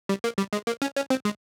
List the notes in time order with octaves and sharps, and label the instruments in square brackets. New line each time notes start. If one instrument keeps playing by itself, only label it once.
[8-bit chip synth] G3
A#3
G3
G#3
A#3
C#4
C#4
C4
G#3